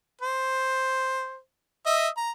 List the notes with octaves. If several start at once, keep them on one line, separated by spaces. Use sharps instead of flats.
C5
D#5 E5
A#5